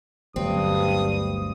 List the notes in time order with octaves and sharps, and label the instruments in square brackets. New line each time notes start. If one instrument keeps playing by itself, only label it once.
[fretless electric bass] G1 D2 F#3 [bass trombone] G2 [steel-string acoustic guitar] C4 [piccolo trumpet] D#6